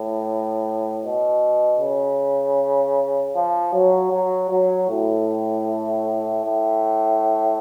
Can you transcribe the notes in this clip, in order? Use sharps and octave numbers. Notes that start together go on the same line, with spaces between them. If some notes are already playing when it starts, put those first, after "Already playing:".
Already playing: A2
B2
C#3
F3
F#3
F#3
F#3
A2
A2